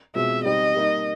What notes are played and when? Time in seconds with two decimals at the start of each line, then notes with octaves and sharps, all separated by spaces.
0.15 B2 G#3 C4 F4 E5
0.44 G3 C4 D#4 G4 D#5
0.75 G3 A#3 D#4